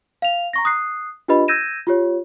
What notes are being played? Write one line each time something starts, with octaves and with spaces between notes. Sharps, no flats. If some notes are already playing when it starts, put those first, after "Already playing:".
F5 F7
A#5 C#6 A#6
D#6 F#6 C7
D4 F4 G4 B4 D#5 B5
E6 G6 G#6 A#6 D#7 E7
F4 G4 C#5